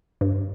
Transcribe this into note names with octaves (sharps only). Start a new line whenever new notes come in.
G2